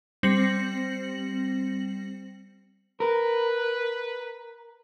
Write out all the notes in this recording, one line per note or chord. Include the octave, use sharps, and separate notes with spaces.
G3 C4 A#6 C#7 F#7
A#4 B4